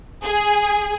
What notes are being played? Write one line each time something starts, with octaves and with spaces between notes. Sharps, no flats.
G#4